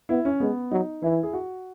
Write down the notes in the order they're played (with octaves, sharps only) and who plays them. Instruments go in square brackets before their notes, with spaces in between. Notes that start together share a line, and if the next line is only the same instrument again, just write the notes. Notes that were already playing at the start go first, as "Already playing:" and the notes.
[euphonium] B3 [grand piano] E4
[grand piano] C#4
[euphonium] G#3 [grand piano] B3
[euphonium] F#3 [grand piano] D#4
[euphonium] E3 [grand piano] E4
[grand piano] G#4
F#4